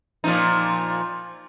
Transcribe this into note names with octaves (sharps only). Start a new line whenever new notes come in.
A#2 F3 D#4